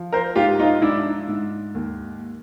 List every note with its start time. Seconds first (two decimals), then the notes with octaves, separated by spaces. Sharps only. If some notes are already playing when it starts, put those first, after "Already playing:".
Already playing: F3
0.12 A#4 C5
0.36 G#2 F4 G4
0.59 D#4 F4
0.82 G#2 D4 E4
1.28 G#2
1.74 D#2